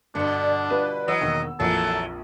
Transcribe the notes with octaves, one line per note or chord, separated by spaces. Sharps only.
G2 B2 D3 D4 C#7
G3 F4 B4
E3 F#3 D#5 E6
E1 D#3 A#3
A#1 F2 E3 F#3 A#3 A4